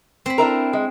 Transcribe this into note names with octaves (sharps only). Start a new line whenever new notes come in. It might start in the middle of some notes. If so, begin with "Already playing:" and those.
C4 B5
D4 E4 A#4
G#3